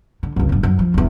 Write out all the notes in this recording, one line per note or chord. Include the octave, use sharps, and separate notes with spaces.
D3
G1 C#2
E1 F#2
F#2
F3
E1 E2